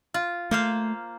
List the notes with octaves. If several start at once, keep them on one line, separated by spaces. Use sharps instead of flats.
F4
A3 A#3 C5 F5